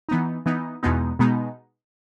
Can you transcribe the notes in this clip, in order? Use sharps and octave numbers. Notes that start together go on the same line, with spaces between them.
E3 B3 D#4
E3 B3 D#4
E2 B2 G#3 B3 D#4
B2 G#3 B3 D#4